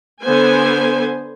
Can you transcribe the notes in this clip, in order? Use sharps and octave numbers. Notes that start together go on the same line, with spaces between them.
D3 B3 C5 G#5